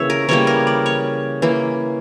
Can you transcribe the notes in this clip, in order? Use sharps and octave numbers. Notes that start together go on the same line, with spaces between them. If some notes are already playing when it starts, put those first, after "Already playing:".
Already playing: C#3 E3 G3 A#3 C#5 E5
A#4
C#3 E3 G3 A#3 C#5
A#4
D5
C#5
E3 A#3